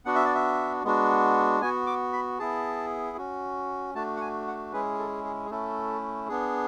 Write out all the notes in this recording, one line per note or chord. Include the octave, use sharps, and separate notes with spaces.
B3 D4 F#4 F#5
E5
D5
E5
G#3 B3 D4 F#4
B3 F#4 G#5
D6
B5
B3 E4 G#4 A5
C#4 F#4
A3 D4 F#4 A5
F#5
G#5
F#5
G#3 C#4 E4 G#4 B4
A4
G#4
G#4
A3 C#4 E4 A4
B3 D4 G#4